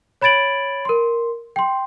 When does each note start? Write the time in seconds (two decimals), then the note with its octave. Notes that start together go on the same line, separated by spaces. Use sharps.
0.21 C#5 B5 G#6 A6 D7 F#7
0.85 A#4 C6
1.56 G5 C6